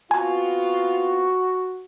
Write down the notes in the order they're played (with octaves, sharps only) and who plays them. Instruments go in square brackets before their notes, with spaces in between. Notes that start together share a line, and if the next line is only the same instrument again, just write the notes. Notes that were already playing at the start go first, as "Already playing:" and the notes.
[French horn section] B3 C4 F4 [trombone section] F#4 [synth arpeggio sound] G#5